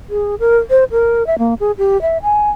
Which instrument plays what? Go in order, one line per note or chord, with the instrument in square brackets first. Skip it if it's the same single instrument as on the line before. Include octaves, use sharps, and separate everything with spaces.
[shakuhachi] G#4
A#4
C5
A#4
E5
A#3
G#4
G4
E5
G#5